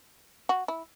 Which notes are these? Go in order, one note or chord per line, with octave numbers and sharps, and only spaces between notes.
F#4
E4